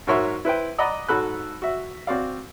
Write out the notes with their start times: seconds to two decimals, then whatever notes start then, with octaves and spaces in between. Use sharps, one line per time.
0.07 G#2 F#4 A#4 C#5 E5 C6
0.45 E4 B4 C5 G5
0.78 D5 D#5 F#5 A#5 B5 D#6
1.09 G#2 F#4 A4 B5 F#6
1.62 F#4 E5
2.07 C4 F#4 D5 F5